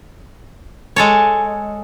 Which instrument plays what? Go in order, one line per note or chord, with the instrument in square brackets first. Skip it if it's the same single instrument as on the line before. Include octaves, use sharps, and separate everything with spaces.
[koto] G#3 A4 C#5